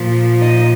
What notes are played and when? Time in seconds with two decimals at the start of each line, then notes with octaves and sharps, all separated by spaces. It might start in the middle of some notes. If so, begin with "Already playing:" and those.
Already playing: A#2 F3
0.41 D#4 D#5